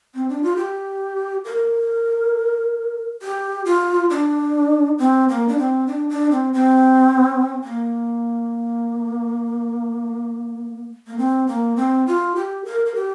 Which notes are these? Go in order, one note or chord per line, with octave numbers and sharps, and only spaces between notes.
C4
D4
F4
G4
A#4
G4
F4
D4
C4
A#3
D4
C4
D4
D4
C4
C4
A#3
A#3
C4
A#3
C4
F4
G4
A#4
A#4
G4